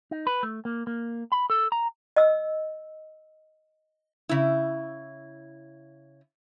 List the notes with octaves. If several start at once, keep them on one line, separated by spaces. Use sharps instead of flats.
D#4
B4
A3
A#3
A#3
B5
A4
A#5
D#5 E6
C#3 E4